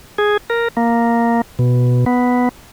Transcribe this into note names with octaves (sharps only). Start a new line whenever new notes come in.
G#4
A#4
A#3
B2
B3